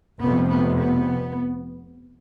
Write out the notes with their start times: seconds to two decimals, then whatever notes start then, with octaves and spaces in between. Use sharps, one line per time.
0.21 F1 F2 C3 B3
0.48 B3
0.76 B3